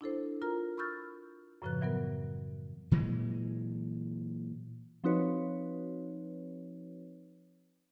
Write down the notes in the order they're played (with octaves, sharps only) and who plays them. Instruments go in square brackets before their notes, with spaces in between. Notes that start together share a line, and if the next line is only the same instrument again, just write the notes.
[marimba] D4 E4 A4 C5
F4 A#4 A#5
B5 C#6 E6 F6 G6 A6
F#2 A2 C#3 F3 B4 F#6
E3 F#3 B3 A#4
[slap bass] A#2 E3 F#3 G#3
[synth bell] F3 C4 D#4 F#4 B4 C#5